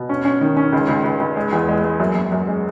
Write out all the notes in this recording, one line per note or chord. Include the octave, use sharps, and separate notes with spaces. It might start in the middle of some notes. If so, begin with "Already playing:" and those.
Already playing: B2
C#4
C#4
D#3
C#4
C#2
C#2
C#2
C#2
G#3
E2
G#3
G#3
F#2
F#2
F#2
G#3